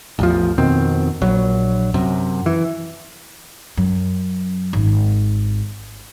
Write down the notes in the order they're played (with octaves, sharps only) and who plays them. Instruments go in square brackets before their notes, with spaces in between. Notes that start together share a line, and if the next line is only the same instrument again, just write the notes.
[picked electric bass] A1 E2 F3
F2 B2 D#3 C4
A#1 F#3
F#2 C3
E3
[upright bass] F#2
G#1